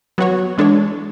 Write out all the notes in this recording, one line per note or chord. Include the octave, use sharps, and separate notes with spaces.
F#3 B3 F#4 C#5
E3 G#3 D4 A4 C#5